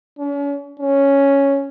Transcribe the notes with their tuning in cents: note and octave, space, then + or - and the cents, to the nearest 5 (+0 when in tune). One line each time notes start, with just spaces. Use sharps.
C#4 +40
C#4 +0